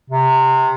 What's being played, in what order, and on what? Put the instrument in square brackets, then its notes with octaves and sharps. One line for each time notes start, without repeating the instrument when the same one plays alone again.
[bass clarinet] C3